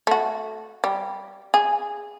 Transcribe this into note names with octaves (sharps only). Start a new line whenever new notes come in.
A3 F#4
G3
G#4